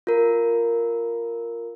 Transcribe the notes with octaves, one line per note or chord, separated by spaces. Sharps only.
F4 A#4